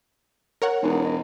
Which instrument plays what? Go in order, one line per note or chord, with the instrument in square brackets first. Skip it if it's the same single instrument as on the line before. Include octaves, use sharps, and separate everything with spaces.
[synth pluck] A#4 C#5 F#5
[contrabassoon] E1 [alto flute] D#4
[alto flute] D#5